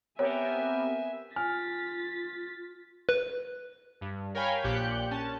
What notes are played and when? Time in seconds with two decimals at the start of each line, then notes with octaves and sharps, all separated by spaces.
0.19 B3 C4 G4 A#4 C#5 E5 G#5
1.36 F4 G#5 F6 A6 B6
3.09 B4
4.01 G2
4.34 A#4 C#5 F5 G5 G#5 B5
4.64 A#1 A#2 G4 F#6 G6 C#7
5.11 C#4 A5